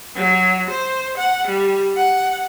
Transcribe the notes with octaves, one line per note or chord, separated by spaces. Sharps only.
F#3
C5
F#5
G3
F#5